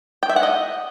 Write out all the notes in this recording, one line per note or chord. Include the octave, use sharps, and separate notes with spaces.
G5
E5
F#5
D#5